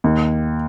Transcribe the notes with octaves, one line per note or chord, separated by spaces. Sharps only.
D#2